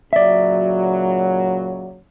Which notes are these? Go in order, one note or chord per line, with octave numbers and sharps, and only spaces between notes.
A#2 C#3 F#3 D5 E5